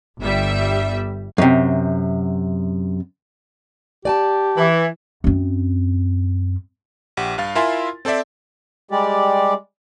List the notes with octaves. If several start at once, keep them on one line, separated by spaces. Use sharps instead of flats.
G1 G3 E5
F#2 C3
G4 D5 G#5 A5
E3
F#2 C4
A#1 G4 F#5
G2 F5 A6
E4 F4 A#4 E5 G#5 C6
C4 A4 C5 D5 E5
G3 G#3 G4 D5